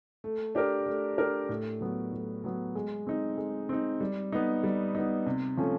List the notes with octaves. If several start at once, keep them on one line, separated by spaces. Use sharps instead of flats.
A3
D4 G4 A#4
A3
D4 G4 A#4
A2
F#3 B3
A2
F#3 B3
G#3
C4 D#4
G#3
C4 D#4
G3
B3 D#4
G3
B3 D#4
C3
F3 A3 C#4